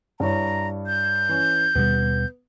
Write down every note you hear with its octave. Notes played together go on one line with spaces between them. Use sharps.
G2 E4 C#5 A#5
G6
E3 C#4
D#2 B2 G3 B3